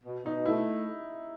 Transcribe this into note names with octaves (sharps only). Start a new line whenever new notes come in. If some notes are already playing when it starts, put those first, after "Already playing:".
B2
B2 D#4
A3 E4